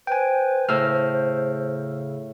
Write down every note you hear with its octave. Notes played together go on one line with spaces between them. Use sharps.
B4 C5 G5 G#5
A2 C#3 E6 F6